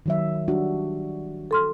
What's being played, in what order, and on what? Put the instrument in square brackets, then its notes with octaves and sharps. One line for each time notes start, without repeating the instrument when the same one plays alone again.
[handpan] D#3 F#3 E5
G3 D4 F#4
[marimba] A4 C6 F6